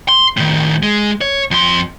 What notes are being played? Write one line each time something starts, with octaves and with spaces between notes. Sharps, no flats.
C6
A2 D#3
G#3
C#5
F2 C6